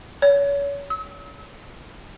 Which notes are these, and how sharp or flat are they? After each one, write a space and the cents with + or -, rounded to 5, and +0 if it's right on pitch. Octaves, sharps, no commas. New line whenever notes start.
C#5 +35
E6 -45